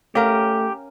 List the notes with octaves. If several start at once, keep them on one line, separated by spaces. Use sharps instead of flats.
A3 C#4 G4 A#4 C#5 F5 F#5